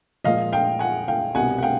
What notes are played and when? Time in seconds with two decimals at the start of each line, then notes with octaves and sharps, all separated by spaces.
0.24 A#2 F3 G#3 D#5 F5
0.53 F5 G5
0.79 F#5 G#5
1.08 F5 G5
1.35 C2 B2 G3 F#5 G#5
1.58 F#5
1.63 F5 G5